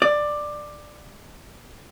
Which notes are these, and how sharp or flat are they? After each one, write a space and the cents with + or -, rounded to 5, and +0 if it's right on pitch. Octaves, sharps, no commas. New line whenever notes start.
D5 +15